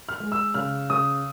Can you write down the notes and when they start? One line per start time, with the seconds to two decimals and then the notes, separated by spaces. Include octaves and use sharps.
0.09 F6
0.20 G#3
0.32 E6
0.54 C#3 F6
0.90 C#3 D#6